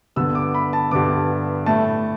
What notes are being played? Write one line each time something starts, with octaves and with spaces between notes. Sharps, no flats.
G2 D3 B3 E6
D6
B5
A5
G2 D3 B3 D6
A2 A3 A5